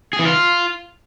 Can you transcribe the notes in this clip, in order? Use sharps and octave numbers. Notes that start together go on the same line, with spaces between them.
G#4
E3
F4